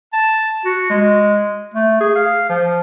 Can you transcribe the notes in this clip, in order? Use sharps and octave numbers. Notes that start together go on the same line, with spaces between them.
A5
F#4
G#3
A3
G#4
F5
F3